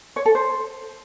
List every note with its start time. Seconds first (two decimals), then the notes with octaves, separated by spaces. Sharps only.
0.16 C#5
0.26 A4
0.35 C5